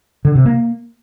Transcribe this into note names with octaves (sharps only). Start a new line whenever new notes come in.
D3
C3
A#3